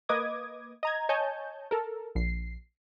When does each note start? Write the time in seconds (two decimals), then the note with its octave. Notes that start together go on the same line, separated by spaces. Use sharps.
0.09 A#3 B4 D#5 D6 D#6 G#6
0.83 D#5 A#5 G#6
1.09 C#5 D#5 G#5 A5 G6
1.71 A4 A#4
2.15 A#1 C7